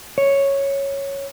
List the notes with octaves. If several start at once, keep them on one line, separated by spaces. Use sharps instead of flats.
C#5